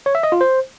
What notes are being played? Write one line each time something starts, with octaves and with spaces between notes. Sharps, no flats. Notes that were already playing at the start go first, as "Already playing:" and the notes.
C#5
E5
D#5
F4
C5